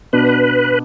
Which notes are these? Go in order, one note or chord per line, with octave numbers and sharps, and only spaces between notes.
B2 B3 D4 B4